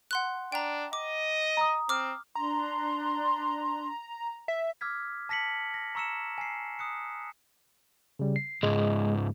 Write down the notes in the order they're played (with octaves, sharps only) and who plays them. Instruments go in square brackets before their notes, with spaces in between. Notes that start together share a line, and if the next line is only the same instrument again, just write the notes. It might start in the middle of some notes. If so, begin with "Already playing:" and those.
[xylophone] F#5 C6 F#6
[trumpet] D4 [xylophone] G5 A#5
[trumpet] D#5 [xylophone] D6
[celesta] A#5 D#6
[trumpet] C4 [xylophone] D6 F6
[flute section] D4 C6 [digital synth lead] A#5
[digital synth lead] E5
[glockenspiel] D6 E6 F6 G#6 B6
A5 A#6 B6 C#7 F#7
A#6
A#5 C#6 E6 C#7 E7
G#5 A5 C7
D#6 F#6 C#7
[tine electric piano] C#3 G3
C7
[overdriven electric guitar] C#2 G#2 [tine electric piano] G#3